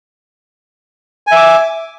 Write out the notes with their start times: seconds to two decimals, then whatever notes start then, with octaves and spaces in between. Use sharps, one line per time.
1.27 G#5
1.32 E5
1.36 D6